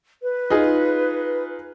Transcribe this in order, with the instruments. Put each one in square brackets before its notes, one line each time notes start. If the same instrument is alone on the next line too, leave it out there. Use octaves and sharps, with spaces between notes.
[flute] B4
[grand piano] D#4 F4 G#4